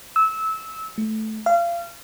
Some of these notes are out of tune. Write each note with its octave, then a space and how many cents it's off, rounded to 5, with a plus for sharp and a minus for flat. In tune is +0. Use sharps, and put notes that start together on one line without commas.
E6 -20
A3 -10
F5 -30